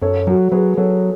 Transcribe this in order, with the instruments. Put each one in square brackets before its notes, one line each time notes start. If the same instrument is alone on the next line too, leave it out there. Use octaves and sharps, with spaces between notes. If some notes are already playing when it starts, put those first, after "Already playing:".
[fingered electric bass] F#2 [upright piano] A4 C#5
[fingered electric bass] F#3 [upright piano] F#4 A4
[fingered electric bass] F#3 [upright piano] G#4 B4
[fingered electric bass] F#3 [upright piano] A4 C#5